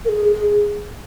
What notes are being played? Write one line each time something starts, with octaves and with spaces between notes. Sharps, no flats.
A#4
G#4
G#4